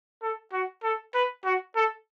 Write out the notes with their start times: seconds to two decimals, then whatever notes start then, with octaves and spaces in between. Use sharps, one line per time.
0.22 A4
0.53 F#4
0.84 A4
1.15 B4
1.45 F#4
1.76 A4